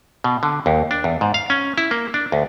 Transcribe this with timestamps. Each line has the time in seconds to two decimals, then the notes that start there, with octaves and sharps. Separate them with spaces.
0.24 B2
0.43 D3
0.66 D#2
0.91 D4
1.04 E2
1.21 G#2
1.34 F5
1.50 C#4
1.78 E4
1.91 A#3
2.14 D4
2.32 D2